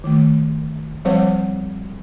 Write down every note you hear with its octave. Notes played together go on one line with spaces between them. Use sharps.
D#3 A3
F3 G3 C4 C5 C#5 F#5